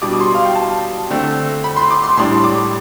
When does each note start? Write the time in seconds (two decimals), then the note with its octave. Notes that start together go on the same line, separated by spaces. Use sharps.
0.02 B2 G3 D4 D6
0.20 C6
0.35 F5
0.45 G5
0.55 A5
1.10 D3 A3 C4
1.64 B5
1.76 C6
1.91 D6
2.04 C6
2.17 A2 G3 D4 C6
2.44 D6